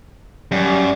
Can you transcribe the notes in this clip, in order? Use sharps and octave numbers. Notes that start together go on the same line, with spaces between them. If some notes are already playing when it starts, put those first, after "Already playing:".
F#2 G3